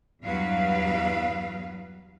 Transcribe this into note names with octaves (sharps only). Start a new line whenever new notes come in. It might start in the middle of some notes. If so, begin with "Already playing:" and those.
E2 G2 F#3 B4 F5